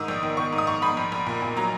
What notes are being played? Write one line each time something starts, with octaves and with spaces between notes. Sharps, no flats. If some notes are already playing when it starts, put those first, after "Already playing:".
Already playing: G#2 D#3 D#6 E6
A#1
D#3
D#3 C#6
G#2
D#6
G#2 C#6
G#2 B5
A#1
A#1
A#2
A#2
F#3 A#5